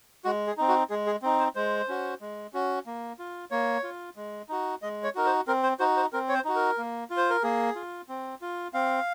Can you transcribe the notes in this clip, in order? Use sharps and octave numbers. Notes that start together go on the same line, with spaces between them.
G#3 F#4
G#4
C4 D#4
F#4
G#3 G#4
G#4
C4 D#4
C5
G#3 C5
C#4 F#4
G#3
C#4 F#4
A#3
F4
A#3 C#5
F4
G#3
D#4 F#4
G#3 D#5
C#5
D#4 F#4 A#4
C5
C4 A#4
C5
D#4 F#4 C5
C5
C4 A#4
C#5
C5
D#4 F#4
A#4
A#3
F4
C5
A#4
A#3 G#4
F4
C4
F4
C4 F5